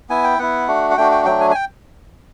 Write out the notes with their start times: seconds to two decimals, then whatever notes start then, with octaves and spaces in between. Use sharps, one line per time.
0.09 B3 E4 G#5
0.24 G5
0.39 B3 E4 F#5
0.67 A3 D4 F#4
0.91 F#5
0.97 A3 D4 F#4 G5
1.11 G5
1.25 F#3 A3 D4 G5
1.40 G#5
1.51 G#5
1.55 G5